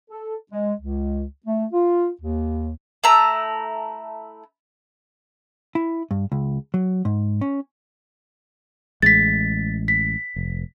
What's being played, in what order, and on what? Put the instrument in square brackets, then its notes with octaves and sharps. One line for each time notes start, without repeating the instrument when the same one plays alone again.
[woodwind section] A4
G#3
C#2
A3
F4
D#2
[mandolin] A3 E4 A#5
[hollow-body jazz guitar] E4
G2
C#2
F#3
G#2
C#4
[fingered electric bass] A1 G#3 [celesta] A6 B6
[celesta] B6
[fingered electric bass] F1